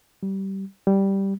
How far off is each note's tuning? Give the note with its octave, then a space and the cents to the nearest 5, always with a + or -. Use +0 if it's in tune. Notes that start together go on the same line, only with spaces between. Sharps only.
G3 -20
G3 -5